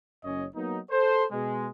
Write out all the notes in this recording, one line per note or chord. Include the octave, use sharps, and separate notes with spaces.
F#1 F#2 C#4 C#5 D#5
F#3 A#3 B3 D#4
A4 C5
B2 G#3